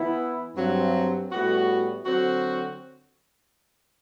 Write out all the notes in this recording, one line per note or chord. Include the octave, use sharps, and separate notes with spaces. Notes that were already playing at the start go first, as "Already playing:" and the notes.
Already playing: E3 B3 E4
G2 F#3 C4
A2 G3 B3 F#4
D3 F#3 C4 F#4